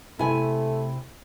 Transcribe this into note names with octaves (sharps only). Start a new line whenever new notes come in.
C3 A3 E4 G#5